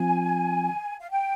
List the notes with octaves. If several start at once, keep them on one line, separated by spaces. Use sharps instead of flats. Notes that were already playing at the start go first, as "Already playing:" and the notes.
Already playing: F3 C4 F4 G#5
F5
G5